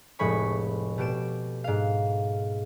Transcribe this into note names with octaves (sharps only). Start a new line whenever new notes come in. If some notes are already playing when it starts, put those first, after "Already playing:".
F1 A2 G#3 C#5 B5 C#6
B2 G4 D7 E7
G#2 F5